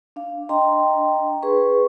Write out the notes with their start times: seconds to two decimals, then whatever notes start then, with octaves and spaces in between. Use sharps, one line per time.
0.16 D4 F5
0.49 D4 D#5 G5 A#5 C6
1.42 G#4 B4 C#6